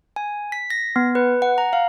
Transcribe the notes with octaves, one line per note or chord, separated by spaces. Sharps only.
G#5
B6
A#6
B3
B4
F#5
A#5
F5